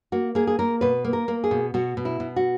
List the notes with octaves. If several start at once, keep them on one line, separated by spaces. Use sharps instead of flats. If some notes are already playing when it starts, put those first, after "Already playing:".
A#3 F#4
A#3 G#4
G#4
A#3 A#4
B2 B4
A#3
A#4
A#3
G#4
B2
B2 F#4
B2
E4
B2
F#4